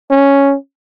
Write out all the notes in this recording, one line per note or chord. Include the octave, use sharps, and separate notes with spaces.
C#4